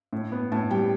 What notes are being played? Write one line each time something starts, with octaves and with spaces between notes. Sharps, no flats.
A2
B3
A2 A5
G3 G5